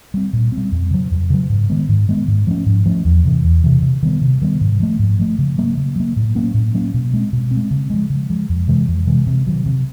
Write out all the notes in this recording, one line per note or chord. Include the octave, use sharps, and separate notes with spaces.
G3 C4
A#2
G3 C4
F2
C#3 F#3
F2
C#3 F#3
G#2
D#3 G#3 B3
G#2
D#3 G#3 B3
G#2
F3 A3 C#4
G#2
F3 A3 C#4
E2
C3 E3
E2
C3 E3
C3
D#3 G3 B3
C3
D#3 G3 B3
G#2
F3 A3
G#2
F3 A3
C#3
F#3 A#3
C#3
F#3 A#3
A2
F#3 A#3 C#4
A2
F#3 A#3 C#4
B2
G#3 C4
B2
C4
G#3
C#3
F3 G#3
C#3
F3 G#3
F2
C3 E3 G#3
F2
C3 E3 G#3
C3
D#3 F#3
C3